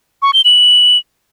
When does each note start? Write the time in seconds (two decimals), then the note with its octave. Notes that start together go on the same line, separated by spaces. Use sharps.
0.22 C#6
0.33 G7
0.45 F#7